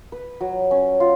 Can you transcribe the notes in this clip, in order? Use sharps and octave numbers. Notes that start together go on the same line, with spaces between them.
B4
F#3
C#4
F4